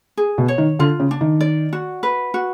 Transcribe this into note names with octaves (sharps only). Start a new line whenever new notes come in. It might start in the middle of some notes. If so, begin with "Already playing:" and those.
G#4
B2
C#5
D#3
D3 F4
C#3
D4
D#3
D5
F#4
B4
F#4